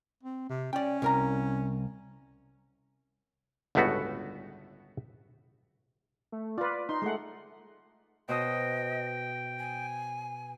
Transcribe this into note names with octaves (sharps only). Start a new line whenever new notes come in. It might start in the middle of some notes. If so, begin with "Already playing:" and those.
C4
C3
C#4 D5 G5
C2 A#4 A#5
G1 C#2 A2 A3 B3 F#4
A3
F4 B4 D5
D#4 C6
G#3 A3 F#5
B2 C5 D#5 G5 D#6
G#5